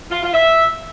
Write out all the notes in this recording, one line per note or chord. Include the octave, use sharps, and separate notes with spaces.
F4
F4
E5